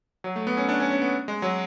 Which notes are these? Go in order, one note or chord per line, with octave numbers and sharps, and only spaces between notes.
F#3
A3
B3
C#4
D4
C#4
C#4
B3
G#3
F#3